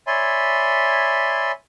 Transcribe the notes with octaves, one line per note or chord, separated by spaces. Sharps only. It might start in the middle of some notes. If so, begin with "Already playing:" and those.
C#5 D5 E5 G#5 B5 C6